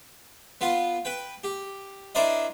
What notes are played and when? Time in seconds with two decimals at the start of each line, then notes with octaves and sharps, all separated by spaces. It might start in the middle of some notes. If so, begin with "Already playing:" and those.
0.61 B3 F4 C6
1.05 B4 G5
1.44 G4
2.15 D4 E4 A#4 C5 D5 D#5